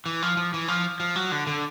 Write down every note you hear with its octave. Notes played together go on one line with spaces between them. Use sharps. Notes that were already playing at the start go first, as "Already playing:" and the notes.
E3
F3
F3
E3
F3
F3
F#3
D3
D3